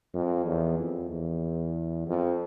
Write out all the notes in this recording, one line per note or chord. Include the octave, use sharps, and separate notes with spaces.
F2
E2
F2
E2
F2